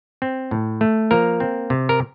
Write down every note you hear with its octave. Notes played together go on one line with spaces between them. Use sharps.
C4
A2
A3
F3 A#3 A#4
C4
C3
A#4